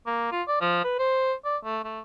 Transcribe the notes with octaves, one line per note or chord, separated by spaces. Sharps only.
A#3
F4
D5
F3
B4
C5
D5
A3
A3